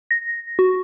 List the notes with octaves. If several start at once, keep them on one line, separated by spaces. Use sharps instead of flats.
A#6
F#4